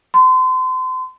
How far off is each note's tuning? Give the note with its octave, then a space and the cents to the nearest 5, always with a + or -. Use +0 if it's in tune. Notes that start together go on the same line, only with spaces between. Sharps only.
C6 -35